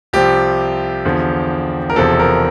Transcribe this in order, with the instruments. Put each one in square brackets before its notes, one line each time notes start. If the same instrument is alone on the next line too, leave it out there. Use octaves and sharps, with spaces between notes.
[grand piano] C2 C3 F3 G4
E2 D3 F3
A#4
E1 E2 C3 F3 A4
A#4